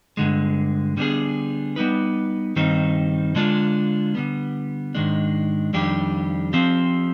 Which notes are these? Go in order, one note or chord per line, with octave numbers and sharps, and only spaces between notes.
G2 D3 G#3
D3 G3 B3 D4 G#4
G3 B3 D#4 B4
G2 D#3 G3 C4 D#4
D3 G#3 D4 F4
D3 G3 B3
G#2 D#3 G#3 D4
F2 D#3 G3 D4 G4
F3 C4 G4